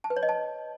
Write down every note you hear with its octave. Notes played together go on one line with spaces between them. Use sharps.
A5
B4
C#5
D#5
A5